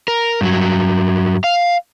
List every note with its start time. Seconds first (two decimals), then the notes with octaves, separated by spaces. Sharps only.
0.08 A#4
0.41 G2 F#3
1.44 F5